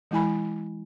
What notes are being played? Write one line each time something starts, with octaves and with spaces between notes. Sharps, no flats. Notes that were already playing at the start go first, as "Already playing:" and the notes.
E3 G#3 E4 G#5 B5